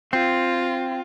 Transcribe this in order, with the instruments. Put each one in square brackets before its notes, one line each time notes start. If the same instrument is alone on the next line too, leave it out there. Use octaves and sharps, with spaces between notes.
[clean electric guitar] C4 [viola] F4